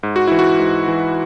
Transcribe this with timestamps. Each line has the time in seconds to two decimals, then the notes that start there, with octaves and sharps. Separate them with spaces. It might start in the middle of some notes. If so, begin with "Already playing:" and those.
0.03 G#2
0.16 F#4
0.27 E3 E4
0.39 F#4
0.59 G#2
0.88 E3